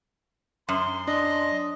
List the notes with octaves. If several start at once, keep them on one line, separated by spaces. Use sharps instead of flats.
F#2 C6
D4 D#5